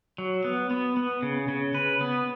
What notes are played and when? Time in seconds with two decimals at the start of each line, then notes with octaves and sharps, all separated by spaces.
0.18 F#3
0.44 B3
0.71 B3
0.97 B3
1.22 C#3
1.48 C#3
1.74 B4
2.01 B3